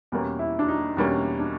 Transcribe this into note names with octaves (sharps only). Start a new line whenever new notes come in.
E2 B2 G3 A#3 C#4
E4
D4
D#4
E2 B2 G3 A#3 C#4 D4
D4